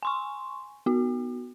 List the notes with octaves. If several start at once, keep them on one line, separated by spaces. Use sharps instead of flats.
G#5 C6 C#6
B3 F#4